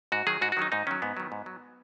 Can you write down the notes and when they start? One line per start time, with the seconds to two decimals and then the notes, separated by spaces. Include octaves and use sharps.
0.12 G#2 F#4
0.27 D#3 F#3 G#4
0.42 G#2 F#4
0.52 F#4
0.57 D#3 F#3 D#4
0.72 G#2 D#4
0.87 D#3 F#3 C#4
1.02 G#2 B3
1.17 D#3 F#3
1.32 G#2
1.46 F#3